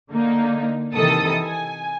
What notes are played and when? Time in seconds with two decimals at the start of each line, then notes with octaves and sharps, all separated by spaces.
0.10 D3 A#3 D#4
0.93 C3 D#3 E3 A4 D#6
1.42 G#5